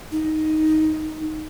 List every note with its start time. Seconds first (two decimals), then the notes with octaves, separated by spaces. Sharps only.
0.12 D#4